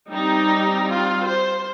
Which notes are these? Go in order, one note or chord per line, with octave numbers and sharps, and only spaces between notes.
G3 C4 D#4
F4
C5